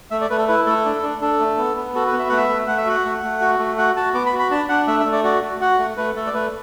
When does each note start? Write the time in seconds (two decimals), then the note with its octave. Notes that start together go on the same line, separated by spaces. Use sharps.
0.11 A3 E5
0.21 D5
0.30 A3 B4
0.38 A4
0.48 E4 B4
0.66 A3 A4
0.85 D4
1.03 D4
1.21 D4 A4
1.40 A3
1.57 B3
1.76 B3
1.95 F#4 A4
2.07 B4
2.13 B3
2.19 E5
2.29 A3 F#5
2.37 E5
2.49 A3
2.67 A3 F#5
2.78 E5
2.86 F#4 F#5
3.05 A3
3.24 A3
3.41 F#4
3.59 A3
3.78 F#4 F#5
3.96 F#4 A5
4.14 B3 D6
4.26 B5
4.33 F#4
4.39 B5
4.51 D4 A5
4.69 D4 F#5
4.87 A3 E5
5.00 E5
5.06 A3
5.12 D5
5.24 F#4 D5
5.43 F#4
5.60 F#4 F#5
5.79 A3
5.97 A3 B4
6.15 A3 A4
6.27 D5
6.34 A3 B4